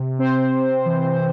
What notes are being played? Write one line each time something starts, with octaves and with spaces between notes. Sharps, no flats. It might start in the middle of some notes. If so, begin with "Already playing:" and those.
Already playing: C3
C4 C5
C3
E3